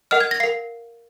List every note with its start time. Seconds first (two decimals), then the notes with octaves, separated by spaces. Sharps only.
0.11 A#4 D#5 F#5 F6
0.21 G#6
0.31 A#6
0.40 A#4 F5 C7